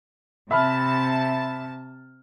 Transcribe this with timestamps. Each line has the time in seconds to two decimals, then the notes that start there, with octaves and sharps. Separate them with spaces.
0.51 C3 E5 A5 B5 F6